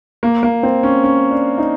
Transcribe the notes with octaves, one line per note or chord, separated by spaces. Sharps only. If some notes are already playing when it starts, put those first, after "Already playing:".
A#3
A#3
C4
C#4
C#4
D4
D#4